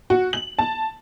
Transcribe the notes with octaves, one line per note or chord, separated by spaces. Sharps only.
F#4
F#7
A5